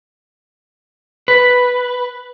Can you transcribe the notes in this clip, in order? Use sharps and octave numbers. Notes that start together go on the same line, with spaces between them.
B4